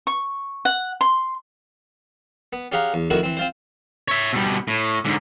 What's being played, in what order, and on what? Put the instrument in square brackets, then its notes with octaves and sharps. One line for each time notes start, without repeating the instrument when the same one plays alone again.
[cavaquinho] C#6
F#5
C6
[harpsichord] B3
C#4 G4 G#4 F5 F#5 A#5
E2
F2 A2 D#3 E4 F#4
E3 C4
C4 F4 C5
[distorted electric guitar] C#5 E5
B2 G3
A2
G#2 D3